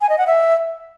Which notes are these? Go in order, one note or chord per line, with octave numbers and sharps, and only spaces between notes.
G#5
D#5
F#5
E5